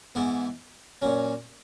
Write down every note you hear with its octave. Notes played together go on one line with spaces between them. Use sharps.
G#2 E3 B3 E4
A#2 F#3 C#4